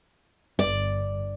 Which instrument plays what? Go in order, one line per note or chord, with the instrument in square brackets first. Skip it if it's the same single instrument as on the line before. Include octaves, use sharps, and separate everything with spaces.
[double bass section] G1 [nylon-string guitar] D5